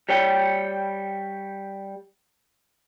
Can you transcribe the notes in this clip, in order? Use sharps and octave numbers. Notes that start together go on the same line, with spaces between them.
G3 C#5 G5